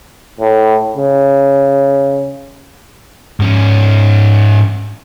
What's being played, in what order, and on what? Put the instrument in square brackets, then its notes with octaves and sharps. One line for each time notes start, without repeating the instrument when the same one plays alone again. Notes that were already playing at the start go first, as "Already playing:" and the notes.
[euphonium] A2
C#3
[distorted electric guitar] G#2 C#4